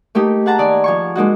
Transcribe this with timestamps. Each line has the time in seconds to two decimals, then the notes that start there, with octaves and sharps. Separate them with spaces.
0.15 A3 A#3 D#4 G4
0.46 G#4 F#5 A5 A#5
0.58 D#3 D5 G#5
0.84 F3 G#5 C#6
1.15 G#3 A#3 D#4 F#4